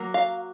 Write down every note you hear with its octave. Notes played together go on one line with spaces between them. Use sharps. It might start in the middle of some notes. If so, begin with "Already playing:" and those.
Already playing: F#3 A#3
F5